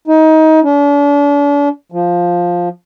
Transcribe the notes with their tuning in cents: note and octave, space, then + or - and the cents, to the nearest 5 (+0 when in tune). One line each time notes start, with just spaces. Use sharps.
D#4 +25
D4 -40
F3 +5